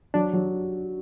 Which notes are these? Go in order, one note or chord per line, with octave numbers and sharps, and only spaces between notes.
F#3 D4
F#3